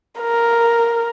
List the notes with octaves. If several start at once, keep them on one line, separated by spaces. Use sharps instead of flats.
A#4